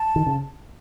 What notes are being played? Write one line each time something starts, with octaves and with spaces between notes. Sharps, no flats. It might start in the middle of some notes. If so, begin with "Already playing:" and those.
Already playing: A5
D#3
C#3